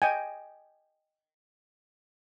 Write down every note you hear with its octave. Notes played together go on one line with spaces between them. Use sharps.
D#5 G5 G#5